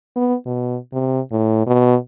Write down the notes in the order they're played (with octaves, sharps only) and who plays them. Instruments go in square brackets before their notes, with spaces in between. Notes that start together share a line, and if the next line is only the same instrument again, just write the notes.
[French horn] B3
B2
C3
A2
B2